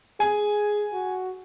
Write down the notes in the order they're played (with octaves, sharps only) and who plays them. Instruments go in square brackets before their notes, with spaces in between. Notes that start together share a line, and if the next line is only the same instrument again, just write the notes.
[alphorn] G#4 [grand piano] G#5
[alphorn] F#4